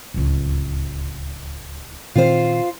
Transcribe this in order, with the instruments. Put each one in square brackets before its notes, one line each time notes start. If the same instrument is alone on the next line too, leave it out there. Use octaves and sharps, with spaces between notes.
[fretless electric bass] D1 C#2
[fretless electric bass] A#2 D#3 C4 [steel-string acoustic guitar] F4 C5